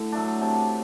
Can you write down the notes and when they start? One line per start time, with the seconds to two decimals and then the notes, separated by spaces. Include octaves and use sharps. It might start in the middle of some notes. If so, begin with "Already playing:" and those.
Already playing: A2 D3
0.12 F#3 A3 D4
0.41 C3 A5